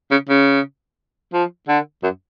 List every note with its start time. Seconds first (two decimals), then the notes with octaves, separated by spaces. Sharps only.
0.11 C#3
0.29 C#3
1.33 F3
1.68 D3
2.03 F#2